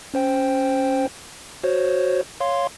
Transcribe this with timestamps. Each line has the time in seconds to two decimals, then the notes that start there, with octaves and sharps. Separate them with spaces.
0.14 C#4 C5 G5
1.64 F#4 C5 C#5
2.40 C#5 F5 C6